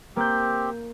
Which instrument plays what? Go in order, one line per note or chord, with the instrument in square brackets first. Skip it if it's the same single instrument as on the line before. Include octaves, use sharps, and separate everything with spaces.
[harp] A#3 G6 [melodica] C4 G4